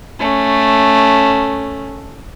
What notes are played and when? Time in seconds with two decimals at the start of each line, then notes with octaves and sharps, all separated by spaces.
0.19 A3 C#4